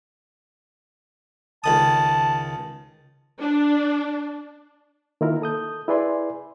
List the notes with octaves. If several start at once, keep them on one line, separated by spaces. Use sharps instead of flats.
C#2 D#3 A5 D#6
D4
D#3 A#3 E4 F4 A#4
A4 D#6 G6
E4 G#4 B4 D5 G#5 C6